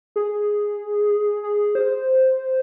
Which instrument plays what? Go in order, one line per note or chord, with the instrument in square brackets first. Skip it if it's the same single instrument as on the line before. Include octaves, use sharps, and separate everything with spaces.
[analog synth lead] G#4
G#4
C5